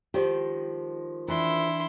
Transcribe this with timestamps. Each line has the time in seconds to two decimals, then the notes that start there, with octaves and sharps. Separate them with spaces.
0.14 D#3 F3 G#3 G4
1.28 E3 D4 E4 C6